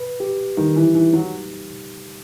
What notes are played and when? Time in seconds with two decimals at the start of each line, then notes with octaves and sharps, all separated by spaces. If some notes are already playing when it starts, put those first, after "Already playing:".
Already playing: B4
0.20 G4
0.57 D#3 G3
0.76 E3
0.94 E3 D#4
1.13 F#3